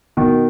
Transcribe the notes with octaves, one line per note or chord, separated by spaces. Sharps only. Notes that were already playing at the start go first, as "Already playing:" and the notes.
B2 D#3